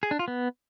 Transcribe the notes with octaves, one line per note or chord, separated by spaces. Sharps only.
G#4
D4
F4
B3